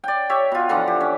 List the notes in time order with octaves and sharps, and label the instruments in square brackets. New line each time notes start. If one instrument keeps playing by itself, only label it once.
[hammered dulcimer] D5 G5
G4 C#5 E5
B2 F4
D3 E3 F3 F#5
G4
C#4